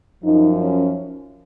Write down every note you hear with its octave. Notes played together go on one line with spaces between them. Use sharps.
F#2 F3 D#4
C#4